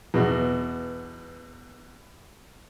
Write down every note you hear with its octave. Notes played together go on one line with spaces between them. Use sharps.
E2 B2